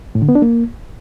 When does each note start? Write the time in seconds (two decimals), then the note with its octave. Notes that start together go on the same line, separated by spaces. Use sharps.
0.15 A2
0.22 D3
0.29 B3
0.35 D4
0.42 A#3